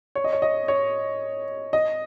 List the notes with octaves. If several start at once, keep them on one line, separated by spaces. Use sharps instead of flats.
C#5
D#5
C#5
D#5
C#5
D#5